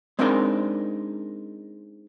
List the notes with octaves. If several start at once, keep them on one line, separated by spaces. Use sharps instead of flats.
G#3 C4 D4 D#4 A#4 D5